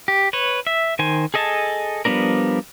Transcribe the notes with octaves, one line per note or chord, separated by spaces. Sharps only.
G4
B4 C#5
E5
D#3 C5 G#5
G#4 A4 D#5 G#5 A5
F3 G3 B3 D4 A#4